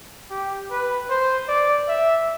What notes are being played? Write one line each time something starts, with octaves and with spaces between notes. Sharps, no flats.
G4
B4
C5
D5
E5